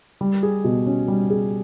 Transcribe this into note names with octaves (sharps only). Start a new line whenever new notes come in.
G3
G#4
B2
C#4
G3
G#4